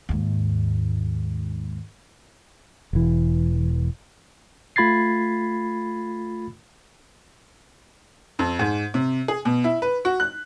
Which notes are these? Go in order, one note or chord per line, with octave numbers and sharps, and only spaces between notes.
D#2 G#2
E1 E3
A3 F4 B5 G#6 A6 C7
F2
G#2
C3
G#4
B2
E4
B4
F#4
F#6